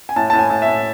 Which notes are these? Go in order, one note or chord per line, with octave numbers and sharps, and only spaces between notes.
G#5
A2 A5
A2 A5
G#5
A2
E5
A2